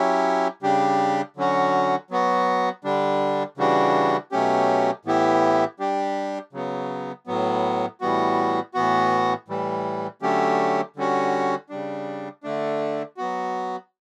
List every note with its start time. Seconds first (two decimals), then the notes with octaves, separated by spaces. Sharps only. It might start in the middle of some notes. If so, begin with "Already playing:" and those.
Already playing: F#3 C#4 E4 G4
0.63 C#3 G3 D4 G4
1.37 D3 F#3 C#4 F#4
2.11 F#3 B3 F#4
2.84 D3 G3 D4
3.58 C#3 E3 G3 D4 F#4
4.32 B2 F#3 A3 C#4 G4
5.05 A2 E3 B3 E4 G4
5.80 G3 D4 G4
6.53 C#3 F#3 B3
7.27 A2 F#3 B3
8.01 A2 E3 G3 B3 F#4
8.74 A2 E3 B3 F#4
9.48 A2 E3 G3
10.22 D3 F#3 A3 C#4 G4
10.96 D3 G3 C#4 F#4
11.69 C#3 G3 D4
12.43 D3 A3 D4
13.17 F#3 B3 F#4